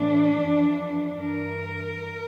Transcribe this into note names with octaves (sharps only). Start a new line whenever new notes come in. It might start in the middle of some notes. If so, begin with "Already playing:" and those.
Already playing: A2 E3 D4
F2 E3
G2 E3 A#4